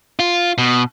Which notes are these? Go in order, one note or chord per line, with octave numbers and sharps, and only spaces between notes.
F4
B2